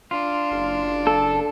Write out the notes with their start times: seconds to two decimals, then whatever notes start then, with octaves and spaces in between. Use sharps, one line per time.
0.11 D4 F4
0.51 F#1
1.07 A4